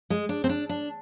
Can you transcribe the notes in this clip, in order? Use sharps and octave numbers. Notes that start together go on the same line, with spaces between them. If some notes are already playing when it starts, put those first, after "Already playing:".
G#3
D4
C4
D4
D4